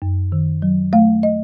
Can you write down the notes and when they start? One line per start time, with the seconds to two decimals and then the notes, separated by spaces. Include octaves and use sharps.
0.02 F#2
0.32 D#3
0.62 F#3
0.93 A3 F5
1.23 D#5